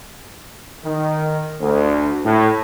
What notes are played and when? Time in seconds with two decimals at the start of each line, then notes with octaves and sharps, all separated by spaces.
0.84 D#3
1.61 D2
2.25 A2